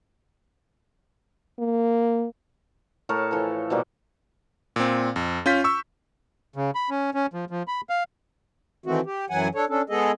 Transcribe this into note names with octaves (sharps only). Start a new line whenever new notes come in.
A#3
A2 A#4 C#5 A5
E3 F3 A4
B2 F3 G3 A#3
A#2 C4
F2
C#4 F4 G6 B6
C#6 E6
C#3
B5
C#4
C#4
F3
F3
B5
F5
D#3 E3 A3 C4 F#4
G4
F#2 E3 F#3 F#5 G#5
D4 A4 C#5
C#4 D4 A4
G#3 B3 G#4 A4 D#5